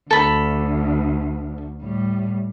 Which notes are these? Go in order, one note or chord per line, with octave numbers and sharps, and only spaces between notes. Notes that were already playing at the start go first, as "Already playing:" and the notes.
D2 A4 B5
A2 G3